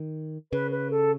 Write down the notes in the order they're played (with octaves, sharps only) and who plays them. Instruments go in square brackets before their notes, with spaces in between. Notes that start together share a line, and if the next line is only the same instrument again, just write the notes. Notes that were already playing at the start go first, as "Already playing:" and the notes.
Already playing: [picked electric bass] D#3
[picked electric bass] C#3 [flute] B4
[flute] B4
A4